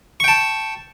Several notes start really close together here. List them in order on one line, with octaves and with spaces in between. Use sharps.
C#6 G5 A5